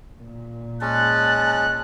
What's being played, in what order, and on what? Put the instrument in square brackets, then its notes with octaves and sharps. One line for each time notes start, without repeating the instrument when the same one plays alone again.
[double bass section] A#2
[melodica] G#3 C#4 [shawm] A5 [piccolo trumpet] F#6